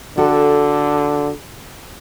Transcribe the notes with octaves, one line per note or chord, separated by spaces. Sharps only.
D3 F#4 A4 G5